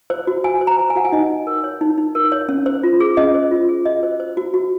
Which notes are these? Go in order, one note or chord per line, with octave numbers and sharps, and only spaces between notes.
C5
F#4
F#4 G#5
C5
A#5
C5
G#5
F#4 F#5
G#5
D#4 D#5
D#4
A#4
C#5
D#4
D#4
A#4
C#5
C#4
C5
F4
G#4
C#4 D#5
C5
F4
G#4
F#4 D#5
C5
C5
F#4
F#4